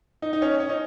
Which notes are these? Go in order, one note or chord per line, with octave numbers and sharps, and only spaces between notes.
D#4
D#4
C#4
C#4
D#4